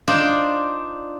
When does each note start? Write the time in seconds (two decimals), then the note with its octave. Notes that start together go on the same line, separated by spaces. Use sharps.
0.08 D4 D#4 F4 C5 D5